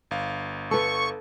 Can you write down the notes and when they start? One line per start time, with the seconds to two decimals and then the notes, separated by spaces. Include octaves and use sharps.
0.11 G1 F5
0.71 A4 B4 C#6